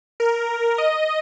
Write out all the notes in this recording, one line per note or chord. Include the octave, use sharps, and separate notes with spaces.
A#4
D#5